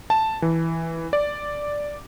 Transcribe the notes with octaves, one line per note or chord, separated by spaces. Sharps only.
A5
E3
D5